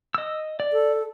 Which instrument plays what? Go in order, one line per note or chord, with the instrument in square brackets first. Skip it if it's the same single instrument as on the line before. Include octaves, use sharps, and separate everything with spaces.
[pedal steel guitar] D#5 E6
D5
[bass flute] A4